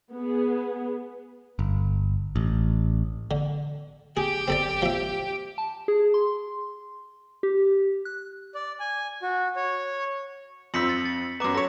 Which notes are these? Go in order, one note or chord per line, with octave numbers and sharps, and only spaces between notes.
B3 G#4
G1
A1
D3
G4 G#4 G5
C4 A4 D5
F3 E5
A5
G#4
C6
G4
F#6
D5
G#5
F#4
C#5
F2 C4 E6 B6 C#7 F#7
A6
A6
F#2 B3 A#5 D6
A4 C#5 A#6